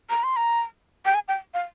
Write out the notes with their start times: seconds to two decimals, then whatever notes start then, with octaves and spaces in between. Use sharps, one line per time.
0.10 A#5
0.23 C6
0.36 A#5
1.05 G5
1.14 G#5
1.28 G5
1.54 F5